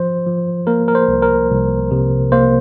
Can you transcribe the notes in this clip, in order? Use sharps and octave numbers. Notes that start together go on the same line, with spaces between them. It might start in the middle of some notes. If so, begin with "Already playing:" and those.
Already playing: F3 C5
F3
A#3 A#4
A#4
C5
C2
A#4
C2
C3
A#3 C5